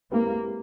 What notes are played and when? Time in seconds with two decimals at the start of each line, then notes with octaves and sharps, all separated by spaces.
0.11 G#3 A#3 C4 E4 G4 B4